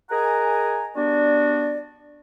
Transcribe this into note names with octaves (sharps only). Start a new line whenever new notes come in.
G#4 A#4 D#5 F#5 G#5 A#5
G3 B3 D4 F#4 D5